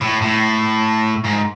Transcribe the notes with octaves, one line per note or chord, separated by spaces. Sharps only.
A2
A2
G#2